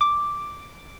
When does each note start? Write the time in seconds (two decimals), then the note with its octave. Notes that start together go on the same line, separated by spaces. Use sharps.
0.01 D6